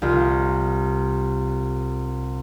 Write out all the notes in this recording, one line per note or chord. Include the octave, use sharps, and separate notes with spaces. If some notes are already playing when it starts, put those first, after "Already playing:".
C2 F4